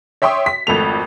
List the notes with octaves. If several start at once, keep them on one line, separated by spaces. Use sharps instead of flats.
C#5 E5 G5 C6 C#6 D#6
B6
G#1 F2 A3 F7